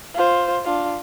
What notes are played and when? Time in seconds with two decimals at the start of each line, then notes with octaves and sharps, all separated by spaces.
0.14 F4 C5
0.64 D4 F4